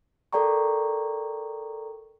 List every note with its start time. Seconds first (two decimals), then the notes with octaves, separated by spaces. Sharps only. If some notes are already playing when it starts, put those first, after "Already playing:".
0.33 A4 A#4 D5 G5 A#5 C#6